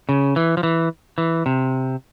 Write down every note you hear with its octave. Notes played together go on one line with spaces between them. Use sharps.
C#3
E3
F3
E3
E3
C3